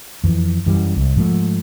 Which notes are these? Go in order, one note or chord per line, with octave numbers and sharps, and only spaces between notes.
F2 E3
F#2 E3 G3
C2
G#2 F3 G#3 A3